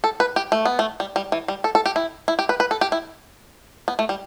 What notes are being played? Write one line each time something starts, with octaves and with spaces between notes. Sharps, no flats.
A4
B4
G4
A3
B3
A3
G3
G3
E3
G3
A4
A4
G4
E4
E4
G4
B4
B4
A4
G4
E4
B3
A3
G3